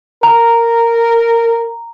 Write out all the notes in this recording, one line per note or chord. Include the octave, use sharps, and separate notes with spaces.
A#4 A#5